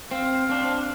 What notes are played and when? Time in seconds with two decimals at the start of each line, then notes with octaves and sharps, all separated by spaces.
0.11 C4 F5
0.49 C4 D4